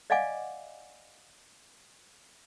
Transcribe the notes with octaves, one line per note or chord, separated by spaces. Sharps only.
D5 D#5 F5 F#5 G#5 D6